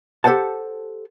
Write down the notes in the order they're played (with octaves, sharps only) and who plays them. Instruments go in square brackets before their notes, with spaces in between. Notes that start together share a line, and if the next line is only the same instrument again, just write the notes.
[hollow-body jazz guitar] G4 A4 B4 C5 F#5 A5